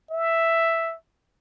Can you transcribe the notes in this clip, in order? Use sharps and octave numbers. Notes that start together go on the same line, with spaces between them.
E5